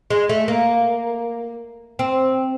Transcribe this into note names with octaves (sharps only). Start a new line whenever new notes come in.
G#3
A3
A#3
C4